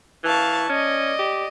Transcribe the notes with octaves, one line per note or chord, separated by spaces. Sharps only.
E3 F5 A5 C#6
C#4 D5 D#5
G4